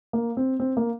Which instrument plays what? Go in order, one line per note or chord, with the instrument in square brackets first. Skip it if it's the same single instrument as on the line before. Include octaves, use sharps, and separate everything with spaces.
[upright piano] A#3
C4
C4
A#3